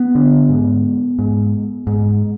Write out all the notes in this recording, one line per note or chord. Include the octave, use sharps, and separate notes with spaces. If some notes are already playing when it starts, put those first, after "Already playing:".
Already playing: B3
D3
G#2
G#2
G#2